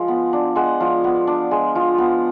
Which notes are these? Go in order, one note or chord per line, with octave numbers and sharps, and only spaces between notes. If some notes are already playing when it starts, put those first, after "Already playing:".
Already playing: F3 G#3
B3
D4
G#3 F#5
F3
B3
D4
G#3
F3
B3